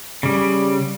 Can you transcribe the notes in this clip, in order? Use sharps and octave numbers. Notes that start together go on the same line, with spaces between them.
C#3 G3